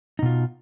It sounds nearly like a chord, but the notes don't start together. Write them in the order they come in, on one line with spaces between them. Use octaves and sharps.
D#4 B2 F4